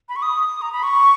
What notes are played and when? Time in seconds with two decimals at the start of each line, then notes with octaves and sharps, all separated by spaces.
0.09 B5
0.16 C#6
0.22 D#6
0.62 A#5
0.72 B5
0.83 C#6